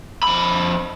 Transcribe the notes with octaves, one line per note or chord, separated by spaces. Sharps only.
F2 B5